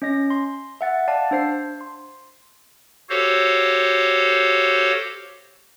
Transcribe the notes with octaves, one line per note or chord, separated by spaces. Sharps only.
C#4 D#5 A#6
C6
E5 F#5 A6
D5 F5 F#5 A5
D4 C5 C7
C6
F#4 G4 A4 C5 C#5 F5